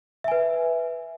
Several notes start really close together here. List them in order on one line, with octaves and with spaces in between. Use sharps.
E5 G#5 B4